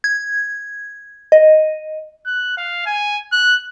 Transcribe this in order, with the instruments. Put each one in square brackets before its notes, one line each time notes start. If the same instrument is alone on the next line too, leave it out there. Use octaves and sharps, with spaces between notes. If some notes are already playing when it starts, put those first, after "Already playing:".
[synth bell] G#6
D#5
[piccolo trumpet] F#6
F5
G#5
F#6